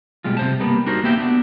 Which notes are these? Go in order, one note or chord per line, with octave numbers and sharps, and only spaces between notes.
B2 G3 G#3 F4
C3 C5 A5
G3 A#3 B3
D4 D#4 F#4 A#4 C5
A#3 B3 G4 E5 G5
B3 D4